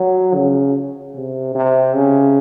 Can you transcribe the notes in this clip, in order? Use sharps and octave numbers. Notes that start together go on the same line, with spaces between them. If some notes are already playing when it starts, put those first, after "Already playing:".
Already playing: F#3
C#3
C3
C3
C#3